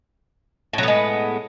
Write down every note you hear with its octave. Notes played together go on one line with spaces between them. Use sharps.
A2 F#3 G#3 B3